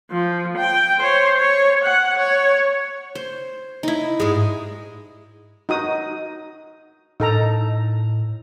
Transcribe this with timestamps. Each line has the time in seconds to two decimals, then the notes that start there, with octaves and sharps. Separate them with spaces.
0.11 F3
0.57 G5
0.99 C5 C#5
1.38 C#5
1.84 F#5
2.19 C#5
3.15 C5
3.83 D#4 E4
4.20 G#2 G#3
5.69 D#4 F#4 D#6
7.20 A2 D#4 A4 A#5